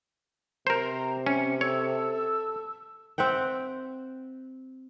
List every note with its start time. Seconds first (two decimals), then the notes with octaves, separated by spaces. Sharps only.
0.67 C3 A#4 C5 A#5
1.26 C#4 C#7
1.61 A4 C#5 E6
3.18 C4 E5 F#5 G5